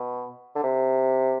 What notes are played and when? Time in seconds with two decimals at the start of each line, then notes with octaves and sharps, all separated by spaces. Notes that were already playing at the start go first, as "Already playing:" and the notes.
Already playing: B2
0.55 D3
0.64 C3